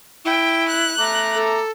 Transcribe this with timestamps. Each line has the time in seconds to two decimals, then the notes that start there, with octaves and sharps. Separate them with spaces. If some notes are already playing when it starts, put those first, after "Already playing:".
0.25 E4 G5
0.68 F#6
0.99 A3 A#5 D6
1.35 A4